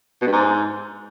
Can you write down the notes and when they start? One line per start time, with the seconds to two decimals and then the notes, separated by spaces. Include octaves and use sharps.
0.22 B2
0.27 G2
0.32 G#2